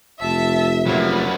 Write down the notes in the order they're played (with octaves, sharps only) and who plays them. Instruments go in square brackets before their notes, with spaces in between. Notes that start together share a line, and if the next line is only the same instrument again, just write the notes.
[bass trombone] F1 [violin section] E5 [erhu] A5
[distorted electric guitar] F#3 A#3 [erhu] B4